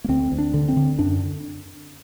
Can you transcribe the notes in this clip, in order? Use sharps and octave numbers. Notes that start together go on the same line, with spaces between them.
A#3
D2 C4
D2
D4
D3
C4
D3
F#2 D4